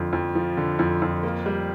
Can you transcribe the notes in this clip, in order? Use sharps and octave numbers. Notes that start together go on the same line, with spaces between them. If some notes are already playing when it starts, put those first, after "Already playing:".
Already playing: F2 D3 F3
F2
F3
D3
F2
F2
A#3
G3